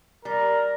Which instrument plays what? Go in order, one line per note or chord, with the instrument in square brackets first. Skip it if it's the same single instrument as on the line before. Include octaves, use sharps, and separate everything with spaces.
[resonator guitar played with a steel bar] G3 [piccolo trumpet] A#4